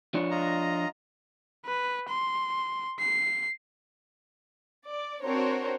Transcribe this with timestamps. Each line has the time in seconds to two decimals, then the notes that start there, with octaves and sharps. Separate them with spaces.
0.14 F3 D4 C#5
0.31 F4 D#5 A#5
1.65 B4
2.09 C6
2.99 C7
4.87 D5
5.23 C4 D4 F#4 A#4 C5 C#5